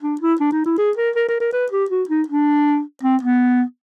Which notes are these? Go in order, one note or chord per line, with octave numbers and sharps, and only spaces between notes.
D4
E4
D4
D#4
E4
G#4
A#4
A#4
A#4
A#4
B4
G4
F#4
D#4
D4
C4
B3